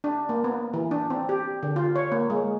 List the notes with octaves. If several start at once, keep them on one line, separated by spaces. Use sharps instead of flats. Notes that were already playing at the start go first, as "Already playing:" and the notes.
D4
A#3
B3
E3
D4
C4
G4
D3
F4
C#5
A#3
G#3